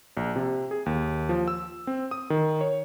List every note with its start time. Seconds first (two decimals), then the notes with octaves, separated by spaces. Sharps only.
0.17 A#1
0.36 C3
0.71 G#4
0.86 D#2
1.29 F3
1.48 E6
1.87 C4
2.11 D#6
2.30 D#3
2.61 C#5